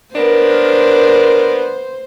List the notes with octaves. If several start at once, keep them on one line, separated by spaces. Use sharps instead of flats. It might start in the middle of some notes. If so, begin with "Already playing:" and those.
B3 D4 A#4 C5